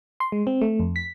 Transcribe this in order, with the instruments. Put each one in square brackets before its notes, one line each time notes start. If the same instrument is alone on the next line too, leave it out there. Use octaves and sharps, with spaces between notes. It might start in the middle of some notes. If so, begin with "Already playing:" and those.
[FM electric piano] C6
G#3
C4
A3
F2
B6